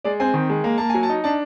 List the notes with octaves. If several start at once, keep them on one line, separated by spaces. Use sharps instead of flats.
G#3 D5
C4 G#5
D#3
G#3
A#3 A#5
A#3 A5
F#3 G#5
A5
D#4
D4 A5